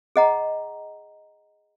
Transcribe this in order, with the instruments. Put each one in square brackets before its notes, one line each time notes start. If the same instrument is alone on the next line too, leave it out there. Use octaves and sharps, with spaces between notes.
[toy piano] G#4 D#5 F#5 A#5